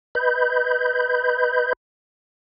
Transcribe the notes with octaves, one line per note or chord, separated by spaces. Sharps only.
B4 D#5 B5 G6